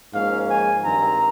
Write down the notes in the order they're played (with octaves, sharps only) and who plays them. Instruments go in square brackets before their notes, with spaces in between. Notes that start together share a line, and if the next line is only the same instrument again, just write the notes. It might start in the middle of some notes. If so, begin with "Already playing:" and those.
[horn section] G#2 F3 A#3 C#4 F5
G#5
G2 D#3 G3 C4 A#5